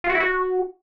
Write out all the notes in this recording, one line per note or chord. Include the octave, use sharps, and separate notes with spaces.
F4
F#4
E4
F#4